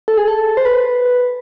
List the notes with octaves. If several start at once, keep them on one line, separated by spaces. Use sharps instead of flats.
A4
G#4
A4
C5
B4